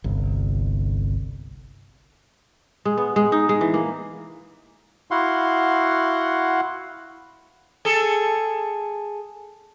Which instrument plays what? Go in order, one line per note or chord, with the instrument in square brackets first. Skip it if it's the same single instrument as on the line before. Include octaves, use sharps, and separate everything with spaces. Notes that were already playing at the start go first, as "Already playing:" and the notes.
[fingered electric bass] G1 C2
[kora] G#3
B3
G#3
D#4
G#3
E3
A#3
[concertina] E4 F#4 F5 F#5 C6
[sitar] G#4 A4